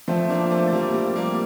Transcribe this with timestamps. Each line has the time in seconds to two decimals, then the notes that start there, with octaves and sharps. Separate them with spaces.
0.08 F3 A3 C4
0.30 A#3 D4
0.40 F4
0.51 A3 C4
0.67 A3
0.73 F3 G3 A#3
0.94 G3
1.05 F4
1.16 G3 A#3